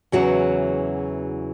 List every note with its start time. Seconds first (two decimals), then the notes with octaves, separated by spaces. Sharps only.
0.12 E2 C#3 E3 F#3 F#4